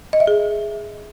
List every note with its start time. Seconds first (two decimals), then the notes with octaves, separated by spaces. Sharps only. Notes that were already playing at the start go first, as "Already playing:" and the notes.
0.13 D#5
0.20 E5
0.27 G#4